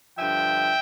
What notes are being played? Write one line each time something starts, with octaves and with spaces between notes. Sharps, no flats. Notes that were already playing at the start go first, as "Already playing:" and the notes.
G2 D3 F3 E5 G5